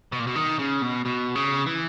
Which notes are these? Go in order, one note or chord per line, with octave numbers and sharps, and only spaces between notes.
B2
A#2
B2
D#3
C#3
B2
B2
C#3
E3